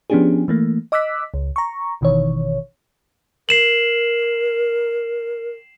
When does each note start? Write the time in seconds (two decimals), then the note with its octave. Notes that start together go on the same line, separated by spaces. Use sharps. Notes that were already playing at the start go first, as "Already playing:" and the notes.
0.10 F3 B3 C#4 D4 G4 G#4
0.48 E3 A3 A#3
0.92 D#5 D6 E6 F#6 B6
1.34 C#2
1.56 A#5 C#6
2.01 G#1 B2 D#3 E3 C#5
3.49 A#4 C7 E7 F#7